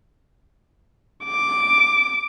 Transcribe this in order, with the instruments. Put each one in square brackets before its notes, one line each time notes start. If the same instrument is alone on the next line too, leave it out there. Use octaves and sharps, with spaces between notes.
[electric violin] D6